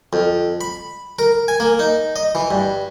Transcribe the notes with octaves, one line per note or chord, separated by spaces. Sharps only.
F2
B5
A#4
G#5
A#3
D#4
D#5
E3
G2